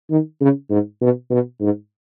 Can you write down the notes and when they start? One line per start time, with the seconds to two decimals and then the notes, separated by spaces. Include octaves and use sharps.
0.10 D#3
0.41 C#3
0.70 G#2
1.01 B2
1.30 B2
1.61 G#2